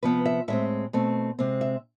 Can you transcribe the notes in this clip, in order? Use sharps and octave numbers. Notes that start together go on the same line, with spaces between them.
C3 F3 B3 B4
E5
A2 G#3 C4 E5
B2 A3 C4
C3 G#3 C4
E5